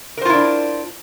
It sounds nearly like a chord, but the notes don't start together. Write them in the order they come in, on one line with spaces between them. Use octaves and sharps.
A#4 C5 F4 E4 D4